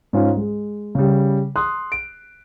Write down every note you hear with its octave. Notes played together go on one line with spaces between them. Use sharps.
G#2 C#4 F4
G#3
C#3 G3
C6 D#6 F#6
D7